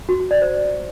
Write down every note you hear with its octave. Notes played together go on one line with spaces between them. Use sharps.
F#4
F#4
D5
C5